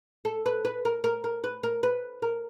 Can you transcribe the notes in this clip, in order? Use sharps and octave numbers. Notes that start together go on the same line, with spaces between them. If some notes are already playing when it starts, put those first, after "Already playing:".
A4
B4
B4
A#4
A#4
A#4
B4
A#4
B4
A#4